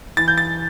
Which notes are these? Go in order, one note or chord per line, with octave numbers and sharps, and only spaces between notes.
E3 A6
G6
A6